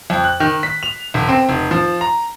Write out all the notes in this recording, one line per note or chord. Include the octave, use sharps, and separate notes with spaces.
F2
F#6
D#3
B6
F7
E1
C4
F1
F3
A#5